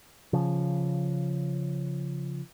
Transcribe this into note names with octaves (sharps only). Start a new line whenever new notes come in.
C#3 F3